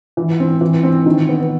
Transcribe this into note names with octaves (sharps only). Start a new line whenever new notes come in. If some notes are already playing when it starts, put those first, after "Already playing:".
E3
C4
E3
C4
D#3
B3